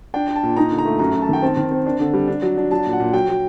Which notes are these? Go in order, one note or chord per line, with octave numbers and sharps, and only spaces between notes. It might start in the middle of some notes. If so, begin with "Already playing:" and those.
D4 G5
D4
A5
A#2
D#4 A#5
D3
A#5
A3
F#2 A#5
F#2
A5
D#3 G5
C4 A5
D#3
C4
D4
D3
G3
D4
F#3
D4
F#3 A5
A#2
F#5
A#2
F#3 G5
F#3